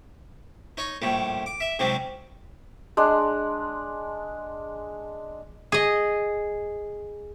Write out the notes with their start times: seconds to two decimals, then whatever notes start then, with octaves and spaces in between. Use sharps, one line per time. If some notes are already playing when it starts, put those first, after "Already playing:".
0.77 D#4 C#5
1.02 A#1 A2 G3
1.46 D6
1.60 E5
1.79 G#2 C3 F#3 G3
2.97 G#3 D4
5.72 G#4 D#5